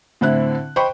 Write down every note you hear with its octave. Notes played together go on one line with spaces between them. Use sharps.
A2 D3 C4 E4 F#6
C5 D#5 G5 B5 C#6